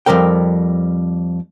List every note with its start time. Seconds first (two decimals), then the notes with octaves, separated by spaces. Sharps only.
0.06 F2 E3 G3 C4 A#4 G5